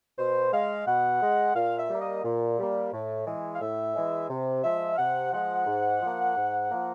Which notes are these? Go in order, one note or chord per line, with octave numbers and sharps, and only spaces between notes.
B2 C5
G#3 F5
B2 F#5
G#3
A#2 F5
E5
G3 A#3
D#5
A#2
G3 A#3
A2
E3 G#3
F5
A2 E5
E3 G#3
C3
F3 G#3 E5
F5
C3 F#5
F3 G#3 F#5
G#2
F3 A#3
G#2
F3 A#3